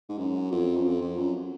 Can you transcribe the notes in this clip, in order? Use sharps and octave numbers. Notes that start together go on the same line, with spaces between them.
G#2
F#2
F2
F#2
F2
F2
F#2